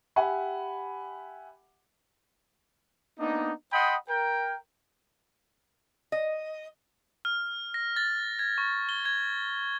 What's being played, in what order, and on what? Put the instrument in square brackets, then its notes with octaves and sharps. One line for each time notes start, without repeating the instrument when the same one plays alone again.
[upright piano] G4 E5 F#5 G#5 B5
[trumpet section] A#3 B3 D4 D#4
D#5 F#5 G5 B5 C6 D#6
A#4 G5
[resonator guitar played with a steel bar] D#5
[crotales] F6
A#6
A6
G#6
C#6
G7
G#6